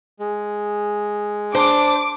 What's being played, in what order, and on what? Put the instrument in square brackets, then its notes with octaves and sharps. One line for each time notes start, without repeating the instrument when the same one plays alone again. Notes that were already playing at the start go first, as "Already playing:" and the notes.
[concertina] G#3
[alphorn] D4 [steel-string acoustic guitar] C5 [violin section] D6